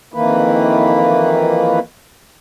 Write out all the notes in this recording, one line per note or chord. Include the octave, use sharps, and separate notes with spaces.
F2 D#3 E3 A#3 B4